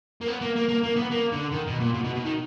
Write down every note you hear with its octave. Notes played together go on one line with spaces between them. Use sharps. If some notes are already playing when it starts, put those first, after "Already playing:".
A#3
B3
A#3
A#3
A#3
A#3
B3
A#3
D3
D#3
B2
A#2
B2
B2
B2
D#3